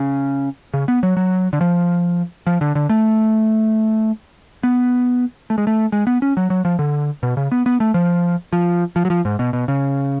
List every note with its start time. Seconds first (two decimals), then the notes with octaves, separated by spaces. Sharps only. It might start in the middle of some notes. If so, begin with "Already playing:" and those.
Already playing: C#3
0.74 C#3
0.88 B3
1.03 F#3
1.17 F#3
1.53 D3
1.61 F3
2.47 F3
2.61 D3
2.75 D3
2.90 A3
4.63 B3
5.50 A3
5.58 G#3
5.67 A3
5.92 G#3
6.07 B3
6.22 C#4
6.37 F#3
6.50 F#3
6.65 F3
6.79 D3
7.23 B2
7.37 C#3
7.52 B3
7.66 B3
7.80 A3
7.94 F3
8.53 F3
8.96 F3
9.05 F#3
9.10 F3
9.25 G#2
9.39 B2
9.53 B2
9.68 C#3